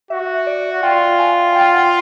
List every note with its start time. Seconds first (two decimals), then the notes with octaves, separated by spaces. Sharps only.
0.10 F#4 E5
0.47 D5
0.83 F4 G5
1.19 G#5
1.55 G5
1.74 F#5